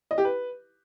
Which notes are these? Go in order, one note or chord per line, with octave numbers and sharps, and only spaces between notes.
D#5
G4
B4